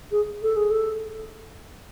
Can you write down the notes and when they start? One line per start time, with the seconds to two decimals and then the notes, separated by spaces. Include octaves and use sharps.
0.11 G#4
0.43 A4
0.57 G#4
0.71 A4